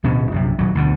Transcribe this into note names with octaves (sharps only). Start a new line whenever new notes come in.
D1 B2 C#4
A#1 F#2 C3
D#1 F#3
D2 B2 D3